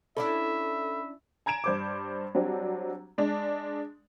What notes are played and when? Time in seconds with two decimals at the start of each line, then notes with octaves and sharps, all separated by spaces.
0.17 C#4 D4 E4 A4 E5 B5
1.46 G#5 A#5 G#6 D7 E7
1.64 G2 C5 D6
2.35 F#3 G3 C4 D4
3.18 G#3 D4